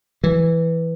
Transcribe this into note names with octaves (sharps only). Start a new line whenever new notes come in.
E3